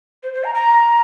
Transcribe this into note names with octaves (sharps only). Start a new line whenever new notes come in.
C5
C5
A#5
A#5